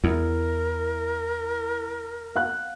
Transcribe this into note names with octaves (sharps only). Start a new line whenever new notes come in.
E2 E4 A#4
F5 F#5 F#6